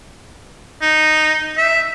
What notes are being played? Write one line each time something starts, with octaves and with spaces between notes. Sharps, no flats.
D#4
E5